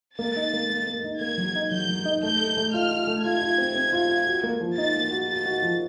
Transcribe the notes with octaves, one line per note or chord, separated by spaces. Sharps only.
A#3 A6
D#4
A#3
A#3
A#3
D#4
A#3 G#6
F#3
D#4
F#3 G6
F#3
D#4
A3 G6
A4
A3
F4 F6
F4
A3
F4 G#6
F4
C4
C4
F4
F4
F#4
A#3
F3
D#4 A6
A#3
F#4
F#4 A6
F#4
F3